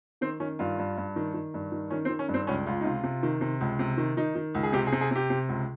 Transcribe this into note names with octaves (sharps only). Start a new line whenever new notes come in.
D#3 C4
D#3 C#4
G2 F4
G2
G2
D#3
D#3
G2
D#3
D#3 C#4
C4
D#3
C#4
G2
C4
C#2 C#4
C#2 F4
D#4
C3 F4
C3
D#3
C3
C#2
C3
D#3
D#3 D#4
D#3
C#2
G#4
C3 G4
G#4
C3
G#4
C3 G4
C3
C#2